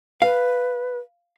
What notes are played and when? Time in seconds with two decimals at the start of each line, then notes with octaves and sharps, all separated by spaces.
0.22 B4 F5